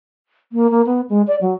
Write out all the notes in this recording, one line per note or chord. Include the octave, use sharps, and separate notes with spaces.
A#3
A#3
B3
G#3
D5
F#3